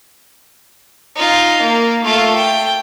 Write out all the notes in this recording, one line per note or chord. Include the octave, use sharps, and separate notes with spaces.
D#4 F4
A#3
A3 F4
G5